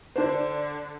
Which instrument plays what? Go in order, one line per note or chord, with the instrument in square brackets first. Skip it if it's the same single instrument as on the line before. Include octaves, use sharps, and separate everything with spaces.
[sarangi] D3 [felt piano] D4 C5